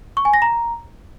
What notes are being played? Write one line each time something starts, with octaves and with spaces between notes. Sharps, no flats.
C#6
G#5
A#6
A#5